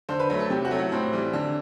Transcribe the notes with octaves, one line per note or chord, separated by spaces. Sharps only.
D3 C5
B4
F#3 A3 B4
A4
C3 G4
F#4
F#3 A3
E4
A2 C4
E3 G3
D3